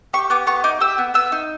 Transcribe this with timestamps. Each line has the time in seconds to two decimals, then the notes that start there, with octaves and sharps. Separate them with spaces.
0.13 G4 C#6
0.30 B3 D6
0.47 B3 C#6
0.64 D#4 D6
0.80 G4 E6
0.98 B3
1.14 B3 E6
1.32 D#4